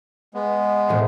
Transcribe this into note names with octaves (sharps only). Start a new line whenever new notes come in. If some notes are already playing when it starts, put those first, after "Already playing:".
G#3 B3
E1 A2 C4